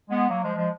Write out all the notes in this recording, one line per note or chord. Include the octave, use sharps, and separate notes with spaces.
G#3 B3
F#3 A#3
F3 G#3
F3 G#3